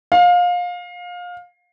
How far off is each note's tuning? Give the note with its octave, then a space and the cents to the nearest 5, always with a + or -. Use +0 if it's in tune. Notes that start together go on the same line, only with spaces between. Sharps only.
F5 +25